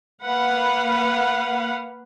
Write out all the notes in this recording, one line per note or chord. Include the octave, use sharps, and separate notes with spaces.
A#3 B4 F5 F#5 B5